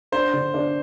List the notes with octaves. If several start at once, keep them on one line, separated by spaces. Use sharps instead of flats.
D4 C5
D3
D4